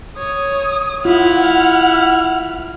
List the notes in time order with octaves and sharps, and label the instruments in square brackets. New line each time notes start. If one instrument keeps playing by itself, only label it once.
[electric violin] C#5 [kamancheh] D#6
[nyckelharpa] E4 [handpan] F4 [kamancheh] F#5 [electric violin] F6